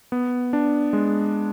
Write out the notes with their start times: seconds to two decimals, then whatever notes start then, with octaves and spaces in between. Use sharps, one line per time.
0.12 B3
0.53 D4
0.93 G#3